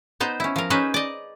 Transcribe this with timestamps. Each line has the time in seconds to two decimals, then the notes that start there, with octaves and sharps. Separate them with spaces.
0.20 B3 D#4 C5
0.40 C#4 E4
0.56 F3 A#4
0.70 C#4 D#4 G#4 B4 C5
0.94 D5 D#5